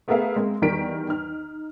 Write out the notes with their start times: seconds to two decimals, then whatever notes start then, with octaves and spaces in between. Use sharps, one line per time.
0.08 A3 B3 G#4 A#4 E5 F5
0.36 G#3 A#3 C4
0.62 E2 D#3 G3 A#4 B6 D7
1.09 D#4 F6